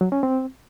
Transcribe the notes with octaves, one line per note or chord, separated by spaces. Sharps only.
F#3
C#4
C4